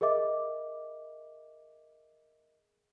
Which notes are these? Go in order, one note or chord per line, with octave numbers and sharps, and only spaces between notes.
G#4 A#4 D#5 E5 D6